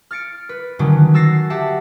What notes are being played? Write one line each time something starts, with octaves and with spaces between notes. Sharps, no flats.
F6 A6 C#7 D7
B4
D3 D#3 F#3 C#4 F#4
F#4 E6 A6 A#6 C7
G4 E5 F#5 A5